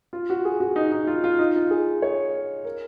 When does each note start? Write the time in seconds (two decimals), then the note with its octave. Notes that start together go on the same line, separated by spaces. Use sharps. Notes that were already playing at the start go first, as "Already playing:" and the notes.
0.13 F4
0.30 F#4
0.45 G#4
0.60 F#4
0.76 D#4
0.92 D#4
1.07 F4
1.24 F4
1.39 D#4
1.56 F4
1.71 G#4
2.02 C#5
2.65 A#4